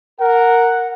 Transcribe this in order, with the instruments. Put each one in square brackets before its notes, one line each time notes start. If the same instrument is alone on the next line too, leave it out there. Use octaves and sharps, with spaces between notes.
[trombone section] A#4 [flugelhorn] F#5